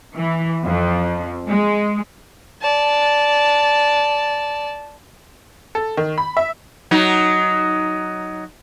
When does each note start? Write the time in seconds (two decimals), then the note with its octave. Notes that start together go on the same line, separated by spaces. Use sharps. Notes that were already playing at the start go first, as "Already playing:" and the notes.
0.16 E3
0.66 F2
1.47 G#3
2.61 D5 A5
5.75 A4
5.97 D#3
6.18 B5
6.37 E5
6.91 F#3 D#4